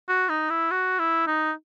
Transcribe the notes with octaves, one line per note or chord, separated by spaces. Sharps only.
F#4
D#4
E4
F#4
E4
D#4